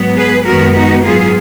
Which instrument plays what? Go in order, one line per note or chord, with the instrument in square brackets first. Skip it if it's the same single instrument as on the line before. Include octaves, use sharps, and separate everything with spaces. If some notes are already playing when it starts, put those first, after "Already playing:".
Already playing: [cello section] G#2 F#3 B3
G#4 B4
F#2 D#3 G#3 B3 F#4 A#4
D#4 F#4
G#2 F#3 B3 F4 G#4